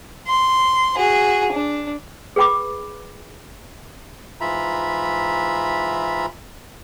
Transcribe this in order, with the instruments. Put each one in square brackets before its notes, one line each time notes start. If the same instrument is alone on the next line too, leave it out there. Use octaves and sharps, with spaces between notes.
[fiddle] C6
F#4 G#4
D4
[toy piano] G#4 B4 G5 B5 D6
[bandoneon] G#2 E3 F4 E5 A#5 B5